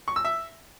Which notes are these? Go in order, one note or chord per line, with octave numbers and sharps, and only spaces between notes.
C#6
E6
E5